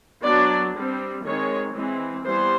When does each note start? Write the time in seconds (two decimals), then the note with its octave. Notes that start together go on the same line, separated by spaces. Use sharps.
0.25 F#3 B3 D4 D5
0.76 G3 C4
1.25 D#3 G#3 C4 C#5
1.75 E3 G#3 C4
2.25 E3 G3 B3 C5